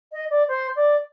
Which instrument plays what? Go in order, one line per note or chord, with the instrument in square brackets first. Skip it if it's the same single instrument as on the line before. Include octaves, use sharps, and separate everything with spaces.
[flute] D#5
D5
C5
D5